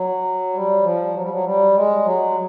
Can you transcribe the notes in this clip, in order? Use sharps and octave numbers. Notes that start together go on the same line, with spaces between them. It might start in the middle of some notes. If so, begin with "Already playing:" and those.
Already playing: F#3
G3
F3
F#3
G3
F#3
G3
G#3
F#3